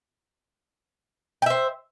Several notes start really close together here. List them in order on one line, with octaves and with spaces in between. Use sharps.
G5 E5 C5